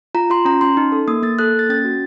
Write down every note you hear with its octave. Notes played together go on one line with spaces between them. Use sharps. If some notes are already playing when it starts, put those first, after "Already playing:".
F4 A#5
F4 C6
C#4 A#5
C#4 C6
D#4
A4
A#3 D#6
A#3 A6
A4 F#6
A#3
A6
C#4 A6
F#4